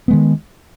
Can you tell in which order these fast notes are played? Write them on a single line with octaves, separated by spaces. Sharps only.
B3 G#3 D#3